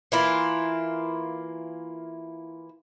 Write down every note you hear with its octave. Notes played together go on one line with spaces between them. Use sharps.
E3 A#3 E4 F4